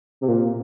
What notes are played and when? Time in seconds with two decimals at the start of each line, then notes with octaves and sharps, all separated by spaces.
0.21 C3
0.28 A#2